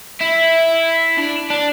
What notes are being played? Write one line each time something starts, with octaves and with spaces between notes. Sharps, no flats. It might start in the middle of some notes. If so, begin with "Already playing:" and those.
E4
D4
D4